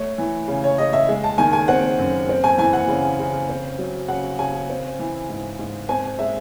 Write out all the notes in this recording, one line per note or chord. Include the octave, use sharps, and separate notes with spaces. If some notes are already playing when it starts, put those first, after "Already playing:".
Already playing: A3 C#5
E3
C#3
C#5
C#3 D#5
E5
G#3
A5
D#3 G#5
G#5
C4 F#5
F#2
C4
G#5
E3 G#5
F#5
C#3
C#3
C4
F#3
C#3 F#5
C#3 G#5
C4
E3
G#2
G#2
C4 G#5
G#3 E5